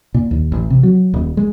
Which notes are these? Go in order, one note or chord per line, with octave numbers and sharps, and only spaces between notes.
A#2
D#2
A1
C3
F#3
D#1
G#3